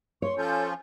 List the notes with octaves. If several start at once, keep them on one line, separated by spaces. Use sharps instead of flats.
C#5 C6 C#6
F3 C#4 F4 A4 G6